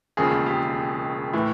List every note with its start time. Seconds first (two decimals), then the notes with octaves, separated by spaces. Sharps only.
0.17 E1 D#2 C#3 F3 G#4
0.46 G4
1.33 A2 E3